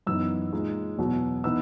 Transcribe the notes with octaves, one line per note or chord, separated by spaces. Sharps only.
F#2 E3 B3 D#4 E6
A#2 G#3 D#4
E2 B2 F#3
E3 B3 D#4 E6